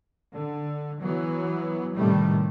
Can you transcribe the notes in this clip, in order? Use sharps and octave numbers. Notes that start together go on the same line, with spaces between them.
D3
E3 F#3 B3
A2 C3 D#3 G3 A3